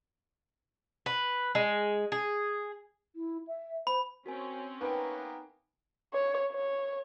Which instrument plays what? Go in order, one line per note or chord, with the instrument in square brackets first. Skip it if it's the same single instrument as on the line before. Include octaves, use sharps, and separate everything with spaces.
[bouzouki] B4
G#3
G#4
[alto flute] E4
E5
[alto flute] C5 [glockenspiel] B5
[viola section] C4 C#4 C#5 [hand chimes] F#4 A#4 G#5
[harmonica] A#3 B3 [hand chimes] D#4 G#5 A#5 [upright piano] B4 G5
[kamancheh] C#5
C#5